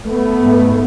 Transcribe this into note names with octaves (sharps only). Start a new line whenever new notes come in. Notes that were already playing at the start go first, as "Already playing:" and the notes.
A3 B3
G#2